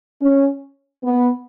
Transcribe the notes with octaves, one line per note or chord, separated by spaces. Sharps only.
C#4
B3